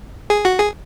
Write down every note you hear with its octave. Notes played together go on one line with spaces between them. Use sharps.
G#4
F#4
G#4